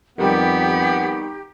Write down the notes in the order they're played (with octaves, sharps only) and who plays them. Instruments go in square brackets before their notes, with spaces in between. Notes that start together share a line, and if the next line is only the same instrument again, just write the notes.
[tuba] F2 [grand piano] D#3 G3 [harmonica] B3 [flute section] G4